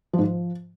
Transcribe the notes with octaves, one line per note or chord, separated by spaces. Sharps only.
F3
G#2
F3